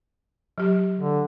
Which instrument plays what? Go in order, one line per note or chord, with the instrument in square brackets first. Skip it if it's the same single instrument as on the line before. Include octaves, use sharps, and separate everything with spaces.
[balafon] F#3 G4
[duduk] D3